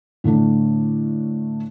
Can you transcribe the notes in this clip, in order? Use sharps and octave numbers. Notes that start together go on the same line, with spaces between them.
A2 D3 A3 D4